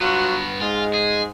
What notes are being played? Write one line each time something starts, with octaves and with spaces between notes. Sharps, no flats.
G2 F#3 B3 F4 F#4
G#2 G#3 F4
G#4